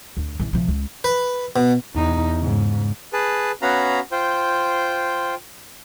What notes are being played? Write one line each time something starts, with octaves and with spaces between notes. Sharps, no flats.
D2
C#3 E3
C3 F3
C#2
B4
B2
E2 D#4
G#2 C#3
G#4 B4 A5
B3 C#4 F#4 F5 A#5 B5
F4 C5 G5